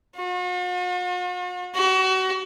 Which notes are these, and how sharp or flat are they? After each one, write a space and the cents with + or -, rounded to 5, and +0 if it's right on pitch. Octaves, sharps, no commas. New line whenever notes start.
F#4 -45
F#4 +30